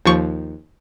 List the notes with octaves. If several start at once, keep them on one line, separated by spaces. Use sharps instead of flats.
D#2 F3 C#6